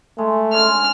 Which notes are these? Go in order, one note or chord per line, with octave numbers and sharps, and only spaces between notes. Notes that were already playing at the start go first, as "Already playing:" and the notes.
G#3 A3
G#3 C#4 D4 F6